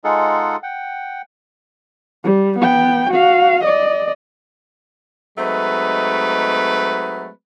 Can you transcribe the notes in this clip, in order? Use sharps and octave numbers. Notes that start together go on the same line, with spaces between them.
G#3 D#4 F4 G#4 A4 F#5
F#5 G5
G3
B3 G5
F#4 F5
D5 D#5
F#3 G#3 A3 C4 D#4 B4